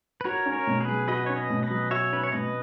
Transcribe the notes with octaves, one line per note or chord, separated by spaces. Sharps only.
B4
F#4 A#4 C#5
C#4
A#4 C#5
B2
G#4 B4
F#3
F#4 B4 D#5
C#4 C#5
B4 D#5
B2
B4 D#5
F#3
F#4 C#5 E5
C#4 B4
C#5
B2 B4 D#5